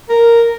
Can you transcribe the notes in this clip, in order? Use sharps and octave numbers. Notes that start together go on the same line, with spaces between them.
A#4